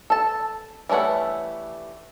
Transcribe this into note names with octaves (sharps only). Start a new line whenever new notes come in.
A4 A5
E3 G3 A3 C#5 F#5